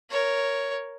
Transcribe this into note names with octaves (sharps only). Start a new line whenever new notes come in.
A#4 C#5